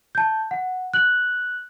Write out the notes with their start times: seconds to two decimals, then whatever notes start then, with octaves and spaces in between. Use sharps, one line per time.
0.15 A5 G6
0.51 F#5
0.94 F#6 F#7